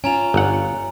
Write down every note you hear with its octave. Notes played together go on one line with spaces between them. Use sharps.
C#4 F4 G#5 A#5 F7
G1 F#5